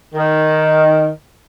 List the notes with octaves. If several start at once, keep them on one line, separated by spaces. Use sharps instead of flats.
D#3